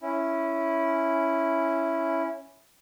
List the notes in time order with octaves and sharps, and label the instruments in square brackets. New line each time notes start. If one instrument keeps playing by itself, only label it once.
[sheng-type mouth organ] C#4 E4